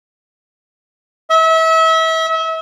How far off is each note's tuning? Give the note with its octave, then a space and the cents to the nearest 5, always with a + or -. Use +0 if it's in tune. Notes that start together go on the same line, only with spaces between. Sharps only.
E5 -30